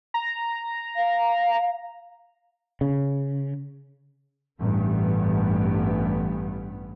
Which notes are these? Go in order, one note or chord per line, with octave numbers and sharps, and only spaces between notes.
A#5
F5
C#3
A1 G2 B3